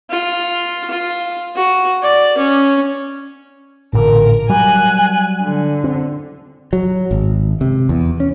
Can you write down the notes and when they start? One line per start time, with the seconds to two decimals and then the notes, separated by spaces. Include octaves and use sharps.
0.10 F4
0.90 F4
1.56 F#4
2.03 D5
2.38 C#4
3.93 A1 A#2 D3 A#4
4.50 F#3 G3 G#5 F#6
5.42 D3
5.84 C4
6.73 F#3
7.11 G#1
7.61 C3
7.89 E2
8.20 C#4